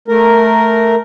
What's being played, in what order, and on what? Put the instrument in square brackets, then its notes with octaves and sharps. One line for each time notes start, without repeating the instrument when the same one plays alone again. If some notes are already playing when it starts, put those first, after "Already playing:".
[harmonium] A3 A#4